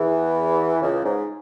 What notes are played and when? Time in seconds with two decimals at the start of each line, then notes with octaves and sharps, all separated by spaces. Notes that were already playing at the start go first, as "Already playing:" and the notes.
Already playing: E2 E3
0.82 C#2 C#3
1.05 G#2